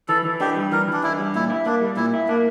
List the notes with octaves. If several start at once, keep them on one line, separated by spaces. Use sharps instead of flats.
E3 A4
E3
D4 G4
G3
E3 A#4
E3
D4
D4 E4
G3
A#2 E4
E4
A#3 D4
G3
A#2 E4
E4
A#3 D4